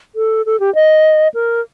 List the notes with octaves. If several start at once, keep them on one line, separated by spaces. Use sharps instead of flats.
A4
A4
G4
D#5
A#4